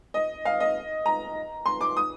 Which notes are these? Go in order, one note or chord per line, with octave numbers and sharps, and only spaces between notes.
D#5
F5
D#5
A#5
C6
D6
D#6